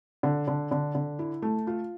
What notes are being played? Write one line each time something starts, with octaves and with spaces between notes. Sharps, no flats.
D3
D3
D3
D3
E4
A3
F4